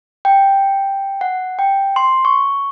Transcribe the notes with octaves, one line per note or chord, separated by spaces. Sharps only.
G5
F#5
G5
C6
C#6